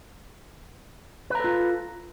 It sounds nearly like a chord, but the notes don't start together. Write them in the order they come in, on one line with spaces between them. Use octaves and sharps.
B4 A#5 A4 F4